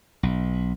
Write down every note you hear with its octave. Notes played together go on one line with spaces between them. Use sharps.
B1